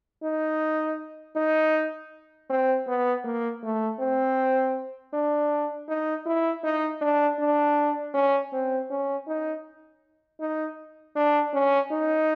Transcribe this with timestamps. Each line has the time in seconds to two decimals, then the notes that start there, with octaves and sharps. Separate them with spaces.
0.23 D#4
1.36 D#4
2.50 C4
2.87 B3
3.24 A#3
3.63 A3
4.00 C4
5.13 D4
5.88 D#4
6.26 E4
6.64 D#4
7.01 D4
7.39 D4
8.14 C#4
8.52 C4
8.90 C#4
9.27 D#4
10.40 D#4
11.16 D4
11.53 C#4
11.92 D#4